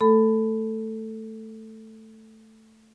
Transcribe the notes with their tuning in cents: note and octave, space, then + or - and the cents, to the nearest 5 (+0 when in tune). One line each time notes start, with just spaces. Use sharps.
A3 +0 A4 +10 B5 +20